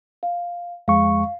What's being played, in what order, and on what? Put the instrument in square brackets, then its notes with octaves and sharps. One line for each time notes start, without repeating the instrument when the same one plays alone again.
[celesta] F5
[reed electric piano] F2 G#3 C#6 [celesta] F5